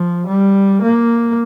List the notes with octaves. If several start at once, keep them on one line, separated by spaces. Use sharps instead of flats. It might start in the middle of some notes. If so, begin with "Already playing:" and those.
Already playing: F3
G3
A#3